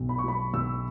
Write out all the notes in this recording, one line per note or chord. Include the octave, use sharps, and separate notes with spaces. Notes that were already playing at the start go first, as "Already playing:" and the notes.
Already playing: B1 B2
B5
C#6
F#3 B5
B1 E6